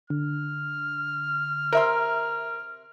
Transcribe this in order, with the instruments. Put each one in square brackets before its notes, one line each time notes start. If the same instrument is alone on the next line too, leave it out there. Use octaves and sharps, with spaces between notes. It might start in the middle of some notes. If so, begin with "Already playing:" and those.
[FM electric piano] D3 [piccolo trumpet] F6
[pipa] C3 E5 C6 [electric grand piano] A#4